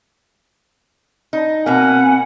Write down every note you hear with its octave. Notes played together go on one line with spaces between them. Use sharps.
D#4
B2 A#3 C4 F#5 G#5